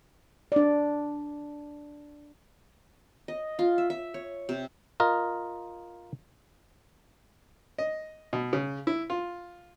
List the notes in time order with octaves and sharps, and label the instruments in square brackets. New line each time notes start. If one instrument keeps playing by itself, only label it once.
[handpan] D4 D5
[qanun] D#5
F4
E5
E5
C#5
C3
[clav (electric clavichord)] F4 A#4 D#5
[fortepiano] D#5
B2
C#3
E4
F4